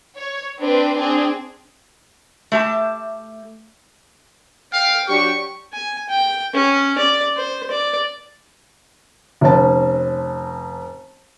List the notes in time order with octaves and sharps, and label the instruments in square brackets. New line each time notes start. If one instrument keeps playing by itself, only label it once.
[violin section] C#5
C4 D4 B4 C5
C4 D4 G#4
[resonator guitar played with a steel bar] A3 G4 A5
[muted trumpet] F5 [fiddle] G5
[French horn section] F#3 D4 G4 [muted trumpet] C#6
[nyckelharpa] G#5
G5
C#4
D5
C5
D5
[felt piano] F1 C#4 A5